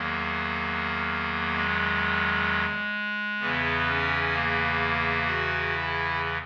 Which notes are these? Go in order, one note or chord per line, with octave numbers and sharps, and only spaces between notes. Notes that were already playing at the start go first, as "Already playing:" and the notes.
Already playing: E2 D#3 F#3 A#3
G#3
E2 C#3 E3 B3
C#4
A#3
F#4
E4